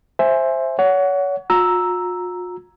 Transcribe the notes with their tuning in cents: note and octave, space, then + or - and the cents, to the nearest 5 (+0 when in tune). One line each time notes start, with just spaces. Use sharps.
C5 +10 E5 +5 G#5 +0
C#5 +35 F#5 +0
F4 +45 A#5 +0 E6 +0